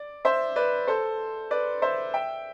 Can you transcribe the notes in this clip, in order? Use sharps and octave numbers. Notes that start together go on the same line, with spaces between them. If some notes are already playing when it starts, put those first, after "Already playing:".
Already playing: D5
C5 E5
B4 D5
A4 C5
B4 D5
C5 E5
E5 G5